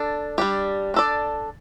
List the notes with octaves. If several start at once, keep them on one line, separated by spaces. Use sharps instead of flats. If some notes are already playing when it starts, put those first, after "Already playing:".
Already playing: D4 A4
G3 D4 G4
D4 A4 D5